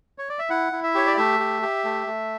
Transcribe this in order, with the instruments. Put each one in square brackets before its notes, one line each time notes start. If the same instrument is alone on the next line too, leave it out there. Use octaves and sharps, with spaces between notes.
[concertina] C#5
D5
E5
E4 F#5
E4
E5
G4 C#5
D5
A3 E5
G4
G4
A3
A3